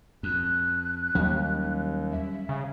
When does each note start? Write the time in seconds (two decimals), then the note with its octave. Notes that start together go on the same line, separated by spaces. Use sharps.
0.23 F2 F#6
1.15 D#2 F#3 G3 C#4
2.11 E5
2.49 C#3